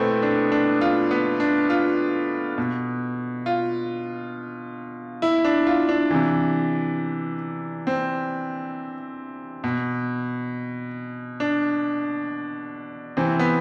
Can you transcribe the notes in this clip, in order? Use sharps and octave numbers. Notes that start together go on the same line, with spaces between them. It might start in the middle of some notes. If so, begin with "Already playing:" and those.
Already playing: B2 A3 B3 C4 E4
D4
D4
F4
B3
D4
F4
B2
F4
E4
D4
F4
D4
C3 E3
C4
B2
D4
C3 E3 C4
B3